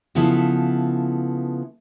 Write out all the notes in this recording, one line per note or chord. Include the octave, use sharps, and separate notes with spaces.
C#3 F3 B3 E4 A4